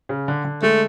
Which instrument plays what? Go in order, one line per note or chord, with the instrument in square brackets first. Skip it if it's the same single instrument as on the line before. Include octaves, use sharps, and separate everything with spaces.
[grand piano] C#3
D3
D3
[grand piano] G#3 [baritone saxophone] A3